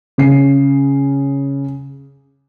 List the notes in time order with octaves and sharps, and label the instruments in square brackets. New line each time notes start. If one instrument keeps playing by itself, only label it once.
[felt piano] C#3 C7